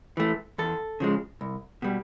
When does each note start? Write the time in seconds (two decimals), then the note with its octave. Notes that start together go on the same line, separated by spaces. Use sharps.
0.17 E3 A3
0.58 E2 A4
1.00 C#3 F3 G#3
1.41 C2
1.82 B2 G3